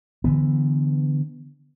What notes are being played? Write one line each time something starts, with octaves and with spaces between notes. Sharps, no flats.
D3 E3 B3